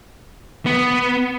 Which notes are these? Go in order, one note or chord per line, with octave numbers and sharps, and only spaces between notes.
B3